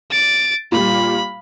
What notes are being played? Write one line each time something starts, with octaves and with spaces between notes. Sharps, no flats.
A6 D7
A#2 G3 B5